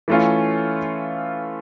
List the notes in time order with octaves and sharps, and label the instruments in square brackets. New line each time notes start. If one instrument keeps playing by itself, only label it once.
[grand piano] E3 A3 C#4 F4